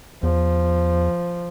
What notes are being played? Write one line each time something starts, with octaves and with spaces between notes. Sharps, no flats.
E2 F3